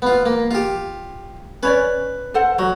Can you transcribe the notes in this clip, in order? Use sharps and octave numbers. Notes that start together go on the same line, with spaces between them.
B3 F4
A#3
F4 G4
C#4 B4 C#5 D5
A4 C5 F#5
F#3 F#4